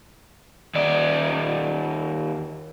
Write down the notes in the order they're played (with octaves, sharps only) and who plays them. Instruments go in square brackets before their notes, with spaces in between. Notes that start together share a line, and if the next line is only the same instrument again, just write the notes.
[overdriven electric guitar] D#2 D5